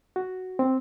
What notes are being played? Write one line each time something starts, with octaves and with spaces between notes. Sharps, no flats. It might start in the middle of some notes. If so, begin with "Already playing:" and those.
F#4
C4